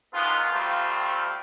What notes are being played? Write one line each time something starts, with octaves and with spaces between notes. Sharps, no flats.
C2 G#2 D#3 F#3 B3 F4
D2 G3 A3 C4 F4